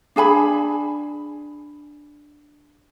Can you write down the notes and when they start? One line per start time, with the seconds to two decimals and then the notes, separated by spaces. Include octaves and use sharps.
0.16 D4 G#4 G#5 B5